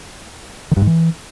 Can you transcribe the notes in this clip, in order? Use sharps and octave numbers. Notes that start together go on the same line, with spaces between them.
D#3
G2
G#2
E3